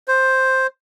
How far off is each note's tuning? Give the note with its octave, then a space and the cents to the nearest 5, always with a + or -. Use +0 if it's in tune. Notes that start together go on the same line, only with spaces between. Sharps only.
C5 +5